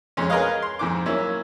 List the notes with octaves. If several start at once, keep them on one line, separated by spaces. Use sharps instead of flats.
F2 G#3 C#4
G#4 A#4 B4 C#5 D#5 F5
C6
F2 G#2 D6
F#3 A#3 C#4 E4